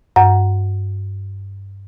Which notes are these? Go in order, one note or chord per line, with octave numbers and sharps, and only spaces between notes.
G2 F#5 A#5